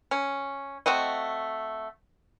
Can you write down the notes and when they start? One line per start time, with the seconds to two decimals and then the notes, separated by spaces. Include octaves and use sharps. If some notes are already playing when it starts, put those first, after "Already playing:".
0.11 C#4
0.86 A3 C4 F#4 D#5